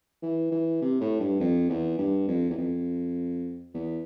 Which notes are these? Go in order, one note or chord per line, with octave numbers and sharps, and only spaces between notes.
E3
E3
C3
A2
G2
F2
E2
G2
F2
E2
F2
E2